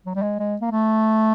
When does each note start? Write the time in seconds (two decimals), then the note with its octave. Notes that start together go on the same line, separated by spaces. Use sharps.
0.06 F#3
0.15 G3
0.22 G#3
0.39 G#3
0.61 A#3
0.71 A3